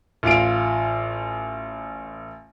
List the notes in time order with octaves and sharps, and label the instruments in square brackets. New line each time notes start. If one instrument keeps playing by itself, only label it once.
[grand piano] A1 F4 F5 D7